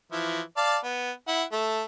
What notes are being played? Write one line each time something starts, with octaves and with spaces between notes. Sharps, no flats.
E3 F3 E4
D5 F5 A5
B3
E4 F#5
A3 A5